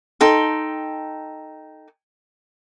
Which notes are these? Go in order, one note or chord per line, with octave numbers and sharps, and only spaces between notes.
D#4 A4 G5 C6